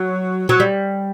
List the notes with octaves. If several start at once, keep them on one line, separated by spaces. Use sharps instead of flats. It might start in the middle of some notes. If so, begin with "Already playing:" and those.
Already playing: F#3
F#3
G3